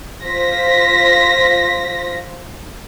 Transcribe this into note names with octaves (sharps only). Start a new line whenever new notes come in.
F4 C5 A#6 B6